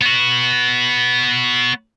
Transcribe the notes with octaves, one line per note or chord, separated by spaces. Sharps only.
B3 F#4